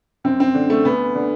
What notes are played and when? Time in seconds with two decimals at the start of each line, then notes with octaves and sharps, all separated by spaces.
0.24 F#2 C4
0.40 C4
0.54 D3
0.70 A3
0.85 D2 B3
1.15 D3